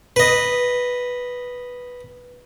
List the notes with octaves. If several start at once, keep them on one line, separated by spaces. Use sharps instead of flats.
B4 D#5